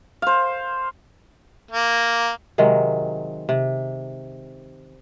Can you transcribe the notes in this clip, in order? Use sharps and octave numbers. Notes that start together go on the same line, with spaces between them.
C5 F5
A#3
C3 D#3 F#3 G#3
C3